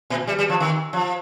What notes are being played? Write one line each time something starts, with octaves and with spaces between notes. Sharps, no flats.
A#2
G3
G3
F3
D#3
F3